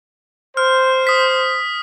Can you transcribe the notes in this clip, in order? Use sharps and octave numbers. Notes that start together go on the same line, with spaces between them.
C5 F6
D#6 B6